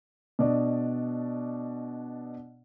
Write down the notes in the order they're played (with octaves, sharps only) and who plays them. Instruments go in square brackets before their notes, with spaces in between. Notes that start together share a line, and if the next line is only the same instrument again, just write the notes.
[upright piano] B2 D4 D5 D#5